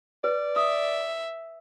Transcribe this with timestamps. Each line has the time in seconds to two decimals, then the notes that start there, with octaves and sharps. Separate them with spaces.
0.24 B4 D5
0.56 E5 D#6